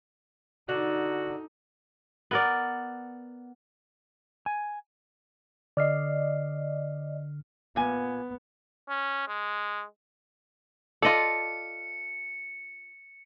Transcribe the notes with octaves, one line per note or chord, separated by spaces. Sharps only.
D3 D#4 F#4
B3 A#4 D5
G#5
D3 D5 D#5 F6 C7
A#2 B3 G#5
C#4
G#3
F4 A4 D5 D#5 C#7